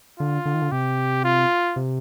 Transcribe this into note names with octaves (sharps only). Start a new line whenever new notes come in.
D3 F4
D3
D#3
D3
C3 G4
F4
C3